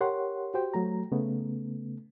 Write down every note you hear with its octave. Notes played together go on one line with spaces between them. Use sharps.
G4 A#4 C#5 F#5 C6
F#4 G4 C5 G5
F#3 A3 A#5
C#3 A3 B3